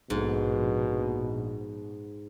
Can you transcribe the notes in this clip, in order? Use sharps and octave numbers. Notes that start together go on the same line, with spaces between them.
A#1 G#2 B2